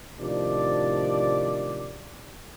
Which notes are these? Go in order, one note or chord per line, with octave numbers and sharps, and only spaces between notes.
A2 C3 D#3 F3 D4 D5